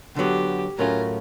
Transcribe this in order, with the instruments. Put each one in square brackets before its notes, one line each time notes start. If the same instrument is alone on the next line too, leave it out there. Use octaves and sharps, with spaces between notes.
[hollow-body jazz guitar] D3 F#3 B3 [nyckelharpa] G4
[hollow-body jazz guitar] A2 F#3 A3 C#4 F4 [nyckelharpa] A#4